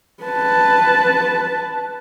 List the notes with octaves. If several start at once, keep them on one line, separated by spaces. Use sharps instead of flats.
B4 A5